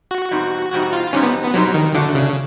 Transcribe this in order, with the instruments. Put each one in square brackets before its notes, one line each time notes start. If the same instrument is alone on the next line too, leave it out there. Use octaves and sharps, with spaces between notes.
[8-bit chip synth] F#4
[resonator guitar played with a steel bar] E2 B2 G3 C4 D#4
[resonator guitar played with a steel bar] E2 B2 G3 C4 D#4 [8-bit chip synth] F#4
[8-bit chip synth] F4
[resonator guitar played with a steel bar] E2 B2 G3 C4 D#4 [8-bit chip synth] C#4
[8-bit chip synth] B3
B3
[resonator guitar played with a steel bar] E2 B2 G3 C4 D#4 [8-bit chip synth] F#3
[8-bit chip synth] D#3
[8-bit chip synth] D3 [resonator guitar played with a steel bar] A3 D4 F#4
[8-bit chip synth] C#3